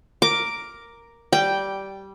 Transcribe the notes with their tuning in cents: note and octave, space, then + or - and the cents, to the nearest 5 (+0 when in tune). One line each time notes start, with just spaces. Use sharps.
A#4 +0 D6 +0
G3 -10 G5 +0